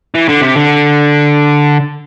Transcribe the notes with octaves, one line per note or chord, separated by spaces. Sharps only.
E3
D3
C3
D3